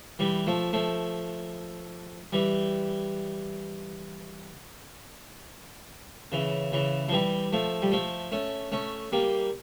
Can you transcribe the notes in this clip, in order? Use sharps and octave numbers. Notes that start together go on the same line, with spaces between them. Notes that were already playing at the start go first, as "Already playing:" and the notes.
E3 G3
F3 A3
F3 A3
E3 G3
C#3 E3
C#3 E3
F3
E3 G3
F3 A3
G3
F3 A3
A3 C#4
A3 C#4
G3 A#3